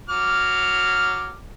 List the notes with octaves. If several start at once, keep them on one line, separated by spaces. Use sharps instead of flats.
F#3 D6 F6